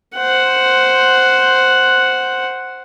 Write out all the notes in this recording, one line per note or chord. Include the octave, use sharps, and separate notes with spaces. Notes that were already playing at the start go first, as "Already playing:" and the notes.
C5 F#5